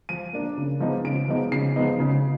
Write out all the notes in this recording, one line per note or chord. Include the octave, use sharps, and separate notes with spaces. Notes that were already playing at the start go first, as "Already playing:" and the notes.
F3 D#7
A#3 D4
C#3
F3 G#3 B3 D#4
C#3 D7
F3 G#3 B3 D#4
C#3 C7
F3 G#3 B3 D#4
C#3